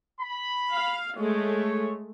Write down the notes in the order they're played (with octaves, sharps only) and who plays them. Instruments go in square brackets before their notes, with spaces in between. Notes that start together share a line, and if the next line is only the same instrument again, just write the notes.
[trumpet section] B5
[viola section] F5
[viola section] G#3 A3 [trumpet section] C#5